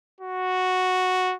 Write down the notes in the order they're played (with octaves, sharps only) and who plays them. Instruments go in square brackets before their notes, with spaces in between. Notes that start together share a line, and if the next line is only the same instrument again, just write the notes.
[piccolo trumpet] F#4